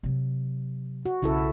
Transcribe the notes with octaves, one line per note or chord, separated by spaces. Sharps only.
C3 F#3
F#4
B1 C#3 E4 A4